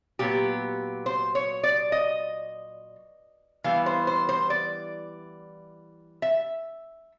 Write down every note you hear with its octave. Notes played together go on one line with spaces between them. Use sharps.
A#2 F#3 B3 G4
C5
C#5
D5
D#5
E3 G3 B3 E4 F5
C5
C5
C5
D5
E5